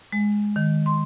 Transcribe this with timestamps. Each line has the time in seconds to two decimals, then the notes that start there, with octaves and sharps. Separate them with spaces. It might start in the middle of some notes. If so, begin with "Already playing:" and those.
0.12 G#3
0.56 D#3
0.86 C6